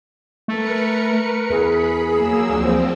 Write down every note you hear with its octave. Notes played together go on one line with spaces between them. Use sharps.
A3 A#4 B4 C#7
E2 G#4 B5
F#3 A#3 E6
D2 F3 C4